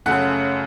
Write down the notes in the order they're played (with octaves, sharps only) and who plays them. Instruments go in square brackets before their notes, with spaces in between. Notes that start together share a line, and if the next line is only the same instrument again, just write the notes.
[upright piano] F#2 C#3 A3 F#5 F#6